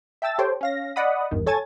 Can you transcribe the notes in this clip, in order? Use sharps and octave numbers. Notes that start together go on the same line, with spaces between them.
E5 G5 A5 E6 A6
G4 A4 C5 C#5 G5
C#4 F5 A#6
D5 D#5 F#5 B5 D#6
G#1 E2 G2 D#3
A4 C#5 G#5 A5 G#6 A6